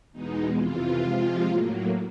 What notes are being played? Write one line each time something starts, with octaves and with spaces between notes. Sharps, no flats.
E2 B2 G#3 D#4
F2 C3 E3 F4
C3 F3 G#3
A2 F#3 A#3